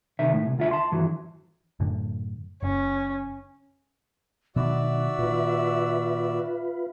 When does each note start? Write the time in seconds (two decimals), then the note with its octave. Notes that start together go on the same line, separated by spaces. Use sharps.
0.19 C2 D#3 E5
0.33 A2
0.46 C2
0.58 D2 F4 E5
0.71 A5 C6
0.92 G2 E3 F#3
1.80 F#2 A2 D3
2.63 F#1 C#4
4.56 B2 D#3 F#3 D#4 F#4 D5 E5 E6
5.19 A#2 D#3 F4 B4